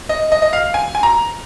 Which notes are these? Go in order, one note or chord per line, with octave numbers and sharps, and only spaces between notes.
D#5
D#5
D#5
F5
G#5
G#5
A#5